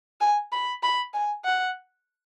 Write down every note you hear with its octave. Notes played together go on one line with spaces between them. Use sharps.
G#5
B5
B5
G#5
F#5